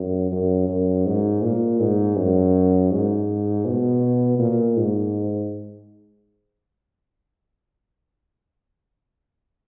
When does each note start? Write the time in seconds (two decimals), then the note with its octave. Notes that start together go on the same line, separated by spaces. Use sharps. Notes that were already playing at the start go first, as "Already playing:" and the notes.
Already playing: F#2
0.32 F#2
0.69 F#2
1.06 G#2
1.42 A#2
1.80 G#2
2.17 F#2
2.91 G#2
3.66 B2
4.39 A#2
4.77 G#2